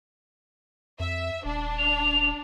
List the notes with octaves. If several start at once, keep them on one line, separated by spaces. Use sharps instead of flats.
F2 E5
D#1 D4
F7